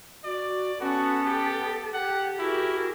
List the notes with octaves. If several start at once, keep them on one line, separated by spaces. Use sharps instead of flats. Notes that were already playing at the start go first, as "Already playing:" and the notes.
F#4 D5
B3 C#4 F#4 A4
G4
G4 F#5 G5
E4 F#4 G#4 A#4